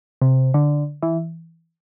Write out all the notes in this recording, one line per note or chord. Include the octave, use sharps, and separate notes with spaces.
C3
D3
E3